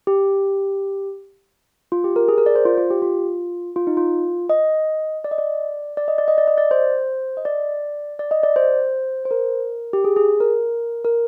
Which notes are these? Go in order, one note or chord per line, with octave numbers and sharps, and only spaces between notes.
G4
F4
G4
A#4
G#4
A#4
D5
C5
F4
F4
G4
F4
F4
D#4
F4
D#5
D5
D#5
D5
D5
D#5
D5
D#5
D5
D#5
D5
C5
D#5
D5
D5
D#5
D5
C5
C5
A#4
G4
G#4
G#4
A#4
A#4